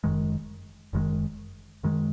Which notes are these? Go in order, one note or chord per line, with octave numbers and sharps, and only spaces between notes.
F#1 F#2 D#3 G#3
F#1 F#2 D#3 G#3
F#2 D#3 G#3